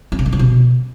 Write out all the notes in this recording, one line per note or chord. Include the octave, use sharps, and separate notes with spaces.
C#4
C#3
D3
B3
B2